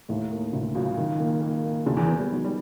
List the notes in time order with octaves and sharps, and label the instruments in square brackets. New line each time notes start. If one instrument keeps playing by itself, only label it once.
[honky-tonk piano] D#2 D#3 [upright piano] A2
[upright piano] A#3
[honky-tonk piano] D2 D3 [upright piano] A2
[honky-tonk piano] C#2 C#3 [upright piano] F#3
[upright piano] D#3
A#3
A#3
A#3
[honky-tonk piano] D2 D3 [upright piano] G#4
[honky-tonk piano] E2 E3
[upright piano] B3
[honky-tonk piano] G3
[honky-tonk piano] F#3 [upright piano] D#4
[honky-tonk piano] G3